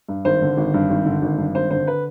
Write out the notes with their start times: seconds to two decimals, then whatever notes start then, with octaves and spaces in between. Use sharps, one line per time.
0.09 G2
0.25 G#1 C5
0.42 D3
0.57 G#1
0.74 G2
0.90 G#1
1.06 D3
1.22 G#1
1.38 G2
1.55 G#1 C5
1.71 D3 C5
1.87 B4